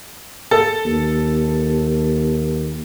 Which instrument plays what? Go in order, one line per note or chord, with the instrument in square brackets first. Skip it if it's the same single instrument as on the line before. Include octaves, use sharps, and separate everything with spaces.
[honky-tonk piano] A4
[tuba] D#2